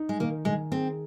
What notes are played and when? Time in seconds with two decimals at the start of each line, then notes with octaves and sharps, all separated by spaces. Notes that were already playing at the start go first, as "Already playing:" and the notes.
Already playing: D#4
0.09 G#3
0.20 D#3 A#3
0.45 D#3 G#3
0.72 C4 G#4